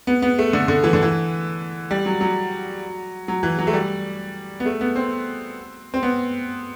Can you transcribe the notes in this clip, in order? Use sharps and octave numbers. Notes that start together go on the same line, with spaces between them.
B3
B3
A3
D3
D3
E3
D3
E3
G3
F#3
F#3
F#3
E3
F#3
A3
G3
B3
A3
B3
C4
C4
B3